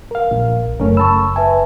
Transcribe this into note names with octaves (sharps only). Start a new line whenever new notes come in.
A#4 F5
A#1
F#1 A3 C#4 A#4
A5 B5 C#6 E6
B4 E5 G#5 A5